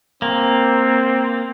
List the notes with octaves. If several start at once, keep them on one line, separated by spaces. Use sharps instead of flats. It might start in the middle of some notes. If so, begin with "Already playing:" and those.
A#3 C4